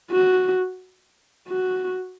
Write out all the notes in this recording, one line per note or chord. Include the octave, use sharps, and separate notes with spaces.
F#4
F#4